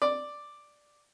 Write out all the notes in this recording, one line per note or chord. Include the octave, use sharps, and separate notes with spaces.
D5